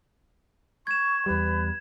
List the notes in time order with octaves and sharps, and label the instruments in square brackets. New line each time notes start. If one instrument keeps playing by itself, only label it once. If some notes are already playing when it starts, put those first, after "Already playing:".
[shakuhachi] C#6 [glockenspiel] G#6 E7
[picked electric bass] E2 G3 [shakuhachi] B4